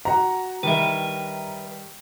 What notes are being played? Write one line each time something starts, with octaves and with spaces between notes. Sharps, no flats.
F#4 F#5 A#5
D#3 G3 B4 E5